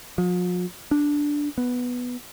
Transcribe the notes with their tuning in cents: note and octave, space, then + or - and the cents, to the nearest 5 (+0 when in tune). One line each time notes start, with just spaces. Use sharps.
F3 +45
D4 -5
B3 +0